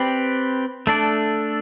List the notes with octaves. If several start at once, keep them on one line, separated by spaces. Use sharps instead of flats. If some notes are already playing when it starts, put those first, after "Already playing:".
Already playing: C4 G4 B4 D5
A3 D4 A4 D5